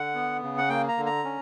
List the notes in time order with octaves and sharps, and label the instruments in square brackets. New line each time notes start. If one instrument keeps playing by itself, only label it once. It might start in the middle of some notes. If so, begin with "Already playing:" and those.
Already playing: [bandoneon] D3 F#5
B3
C#3
F#5
A#3 G5
A#5
D3
A#5
C#4